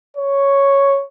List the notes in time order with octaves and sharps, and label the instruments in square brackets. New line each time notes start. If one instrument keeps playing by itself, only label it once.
[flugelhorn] C#5